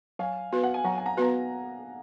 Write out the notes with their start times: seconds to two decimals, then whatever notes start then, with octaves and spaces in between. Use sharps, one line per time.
0.19 F#3 F5 G#5
0.52 B3 F#4 B4
0.63 F#5
0.74 G#5
0.84 F#3 F#5 A#5
0.98 G#5
1.06 F#5 A#5
1.17 B3 F#4 B4 A#5